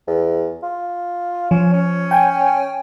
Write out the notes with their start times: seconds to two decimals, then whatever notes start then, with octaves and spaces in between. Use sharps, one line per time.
0.07 E2
0.63 F4
1.51 F3 C#4
1.73 C#4
2.11 G5 G#5